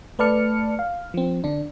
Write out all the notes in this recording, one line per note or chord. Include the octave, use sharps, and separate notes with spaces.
A3 B4 D5 A5 F6 C#7
F5
F3 C4
D3 D4